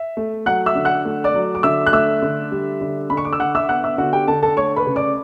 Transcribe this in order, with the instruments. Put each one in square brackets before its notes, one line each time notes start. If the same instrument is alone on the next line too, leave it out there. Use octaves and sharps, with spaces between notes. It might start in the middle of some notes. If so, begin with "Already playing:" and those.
Already playing: [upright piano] E5
A3
F#3 F#5 F#6
E5 E6
D3
F#5 F#6
A3
D5 D6
F#3
D6
D3 E5 E6
F#6
A3 E5 E6
D3
G3
D3
D3 B5
C#6
D6
E6
D3 F#5 F#6
E5 E6
B3 F#5 F#6
E5 E6
D3 F#4 F#5
G4 G5
D3 A4 A5
A4 A5
A3 C#5 C#6
B4 B5
C#3
D5 D6